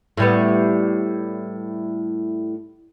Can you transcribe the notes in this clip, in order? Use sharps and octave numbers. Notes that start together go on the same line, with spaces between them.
A2 G3 B3